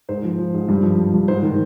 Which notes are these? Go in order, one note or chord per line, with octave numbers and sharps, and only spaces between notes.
G#2 C5
F3
F3
G#2
G2
F3
F3
G2
G#2 C5
D#3